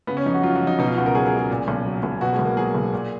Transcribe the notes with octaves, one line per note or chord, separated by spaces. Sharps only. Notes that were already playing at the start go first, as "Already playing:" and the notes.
C#3 B3
C#4
F2 D#4
F#4
F#3 F4
F#4
F2
D#4
B2 D#4
F4
C#2 F#4
A#4
F#3 G#4
G#4
C#2
G#4
A#2
B1
F#3
B1
B2 F#4
G#3
B1
A#3
F#3 G#4
B1
A#2